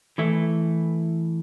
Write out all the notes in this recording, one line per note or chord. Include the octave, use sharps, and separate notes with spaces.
E3 A3 E4